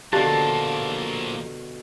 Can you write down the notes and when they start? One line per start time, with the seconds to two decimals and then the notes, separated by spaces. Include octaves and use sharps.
0.13 B2 D3 F3 A#3 G4 A4 A5